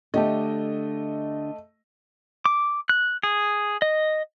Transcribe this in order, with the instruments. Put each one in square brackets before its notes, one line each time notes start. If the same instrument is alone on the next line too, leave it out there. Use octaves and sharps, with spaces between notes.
[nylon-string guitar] D3 G4 [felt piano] A3 D#5
[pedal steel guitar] D6
F#6
G#4
D#5